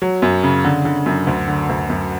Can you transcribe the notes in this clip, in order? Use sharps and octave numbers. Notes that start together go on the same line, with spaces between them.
F#3
F#2
C#3
D3
D3
F#2
D2
D3
D2
F#2